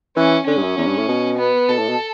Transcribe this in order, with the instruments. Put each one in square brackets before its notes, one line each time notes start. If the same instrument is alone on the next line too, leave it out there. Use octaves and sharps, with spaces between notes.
[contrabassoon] E3 [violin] C#4
[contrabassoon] D3 [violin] C#4
[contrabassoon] G2
F#2
E2
G2
A2
B2
[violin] B3
[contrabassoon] B2 [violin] A4
[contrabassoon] A2
B2